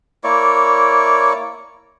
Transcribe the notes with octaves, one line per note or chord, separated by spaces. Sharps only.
A#3 E4 C#5 D5